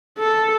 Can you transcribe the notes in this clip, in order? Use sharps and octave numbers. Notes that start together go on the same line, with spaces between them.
A4